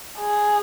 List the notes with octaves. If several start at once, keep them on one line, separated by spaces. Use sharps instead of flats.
G#4